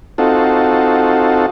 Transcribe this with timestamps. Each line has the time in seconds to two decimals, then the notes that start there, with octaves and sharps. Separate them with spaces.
0.18 C4 D#4 F4 F#4 A4